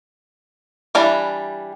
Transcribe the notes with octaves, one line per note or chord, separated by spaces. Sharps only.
E3 G3 D4